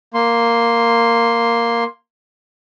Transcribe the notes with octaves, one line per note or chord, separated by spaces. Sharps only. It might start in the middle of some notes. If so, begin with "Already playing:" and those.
A#3 C6